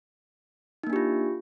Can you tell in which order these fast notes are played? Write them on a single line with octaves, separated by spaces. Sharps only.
D#4 A#3 D4 G4 F4